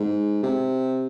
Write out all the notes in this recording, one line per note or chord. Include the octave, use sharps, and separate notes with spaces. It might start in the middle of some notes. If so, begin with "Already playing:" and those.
Already playing: G#2
C3